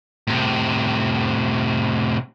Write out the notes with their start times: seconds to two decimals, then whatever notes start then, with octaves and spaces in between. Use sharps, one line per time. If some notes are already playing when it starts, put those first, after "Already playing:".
0.28 A2 C3